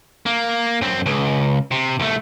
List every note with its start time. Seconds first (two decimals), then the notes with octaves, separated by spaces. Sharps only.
0.26 A#3
0.82 F#2 C4
1.06 C#2
1.72 C3
2.00 C2 A3